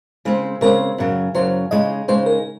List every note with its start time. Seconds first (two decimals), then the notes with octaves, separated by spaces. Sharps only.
0.25 C#3 G#3 C4
0.61 C#3 G#3 C4 A#4
0.98 F#2 C#3 F#3
1.35 F#2 C#3 F#3 C5
1.71 C#3 G#3 D#4 D#5
2.08 C#3 G#3 D#4 C5
2.26 A#4